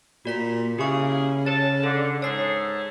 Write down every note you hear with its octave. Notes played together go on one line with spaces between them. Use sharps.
A#2 F#4 D5 B6
C#3 A#3 E4 G4 G#4 C#6
C#5 A5
D3 A4
G#2 G#4 A4 C#5 C7